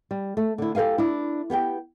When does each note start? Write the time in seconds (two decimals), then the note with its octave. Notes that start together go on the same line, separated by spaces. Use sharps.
0.11 G3
0.37 A3
0.58 D3 E4
0.75 G4 A4 A#4 F5 G#5
0.98 D4 E4
1.50 B3 G4 F#5 G5